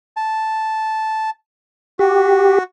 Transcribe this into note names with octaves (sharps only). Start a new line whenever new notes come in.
A5
F#4 G4